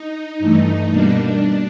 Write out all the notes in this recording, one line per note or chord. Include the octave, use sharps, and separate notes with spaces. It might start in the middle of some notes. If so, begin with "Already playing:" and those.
Already playing: D#4
G2 E3 A3
B2 G3 A#3 D4